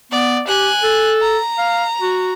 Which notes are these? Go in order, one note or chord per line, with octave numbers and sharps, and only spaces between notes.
B3 D5
G4 G#5 F#6
A4
A#5
F5
F#4